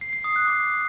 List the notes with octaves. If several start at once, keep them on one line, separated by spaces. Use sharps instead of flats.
C7
C7
D#6
F#6
D6